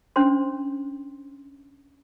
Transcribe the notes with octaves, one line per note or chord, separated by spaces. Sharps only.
C#4 D4 C5 C6